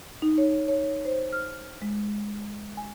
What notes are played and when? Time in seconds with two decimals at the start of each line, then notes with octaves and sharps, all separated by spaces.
0.22 D#4
0.38 C#5
0.68 C#5
1.05 C5
1.32 F6
1.82 G#3
2.77 G#5